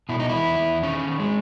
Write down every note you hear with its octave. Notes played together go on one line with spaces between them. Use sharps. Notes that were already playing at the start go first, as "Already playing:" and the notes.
B2 E4
D#4
E2 E4
E2
D#3 C#4
D#3
G#3